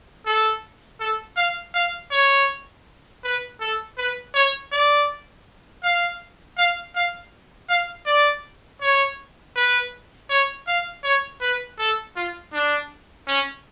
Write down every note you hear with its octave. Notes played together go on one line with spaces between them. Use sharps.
A4
A4
F5
F5
C#5
B4
A4
B4
C#5
D5
F5
F5
F5
F5
D5
C#5
B4
C#5
F5
C#5
B4
A4
F4
D4
C#4